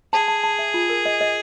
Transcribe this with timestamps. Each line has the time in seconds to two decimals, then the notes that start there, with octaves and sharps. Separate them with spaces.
0.13 G#4 A5
0.28 A5
0.44 A5
0.59 E5
0.74 F4
0.90 A#4
1.05 D#5
1.21 D#5